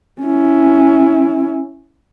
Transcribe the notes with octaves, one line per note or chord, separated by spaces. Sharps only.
C#4 E4